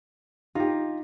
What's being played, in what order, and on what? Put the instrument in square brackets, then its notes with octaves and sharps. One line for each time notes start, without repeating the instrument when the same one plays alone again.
[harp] D#4 [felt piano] F4 G4